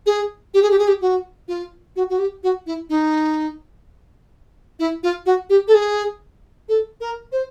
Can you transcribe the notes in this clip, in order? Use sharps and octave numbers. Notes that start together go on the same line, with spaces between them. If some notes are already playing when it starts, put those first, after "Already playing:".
G#4
G4
G#4
G4
G#4
G4
F#4
F4
F#4
F#4
G4
F#4
E4
D#4
E4
F4
F#4
G4
A4
G#4
A4
A#4
C5